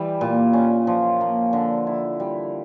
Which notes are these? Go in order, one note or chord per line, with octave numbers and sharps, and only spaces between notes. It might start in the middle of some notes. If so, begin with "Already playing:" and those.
Already playing: E3 G3
A#2
C#4
F3
A#3
D3
E4
G3